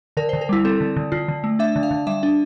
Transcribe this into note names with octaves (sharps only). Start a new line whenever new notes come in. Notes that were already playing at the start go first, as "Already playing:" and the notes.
D3 A#4
C5
D3
A#4
G3 E4
C4 A4
D3
D3
D3 F4
D3
A3
D4 E5
D3
F5
D3
G3 E5
D4